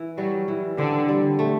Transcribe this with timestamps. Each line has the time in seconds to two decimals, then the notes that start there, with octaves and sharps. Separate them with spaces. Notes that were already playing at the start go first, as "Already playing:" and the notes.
Already playing: E3
0.18 F#3 G3
0.48 E3
0.78 D3 C4
1.09 G3
1.39 A3